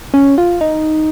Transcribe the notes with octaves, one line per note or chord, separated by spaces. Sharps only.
C#4
F4
D#4